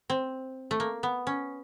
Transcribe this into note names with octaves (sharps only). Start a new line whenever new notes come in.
C4
A3
A#3
B3
C#4